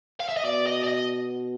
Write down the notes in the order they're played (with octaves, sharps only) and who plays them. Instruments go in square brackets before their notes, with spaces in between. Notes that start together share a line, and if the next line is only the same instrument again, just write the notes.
[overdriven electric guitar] F5
E5
D#5
[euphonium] B2 [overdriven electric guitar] D5
[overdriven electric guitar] D#5
D5
D#5